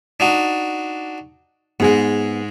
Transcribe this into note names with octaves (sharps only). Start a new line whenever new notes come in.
D4 D#4 F#4
G#2 G#3 B3 G#4